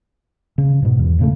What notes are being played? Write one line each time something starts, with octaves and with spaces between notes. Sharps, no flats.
C#3
G#2 B2
E2
A2 C#3 A3